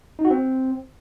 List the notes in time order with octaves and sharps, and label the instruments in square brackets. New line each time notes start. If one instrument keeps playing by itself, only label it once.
[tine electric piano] D#4
F#4
C4